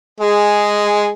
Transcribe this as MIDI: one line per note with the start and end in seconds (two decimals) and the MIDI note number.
0.20 1.11 56
0.20 1.11 68